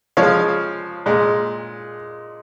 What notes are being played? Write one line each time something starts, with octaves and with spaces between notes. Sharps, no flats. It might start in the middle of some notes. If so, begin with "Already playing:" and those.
C#3 F3 G#3 C#5 F5
A#2 G#3